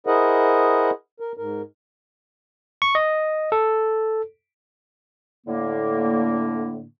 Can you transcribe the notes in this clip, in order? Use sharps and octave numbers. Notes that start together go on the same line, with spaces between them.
E4 G#4 A#4 C5 D#5 F#5
A#4
G#2 A#4
C#6
D#5
A4
A2 D3 A#3